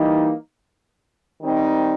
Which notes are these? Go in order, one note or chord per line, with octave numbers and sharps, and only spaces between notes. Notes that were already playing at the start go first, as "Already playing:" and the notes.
Already playing: E3 G3 A#3 D#4
D#3 G3 C4 D#4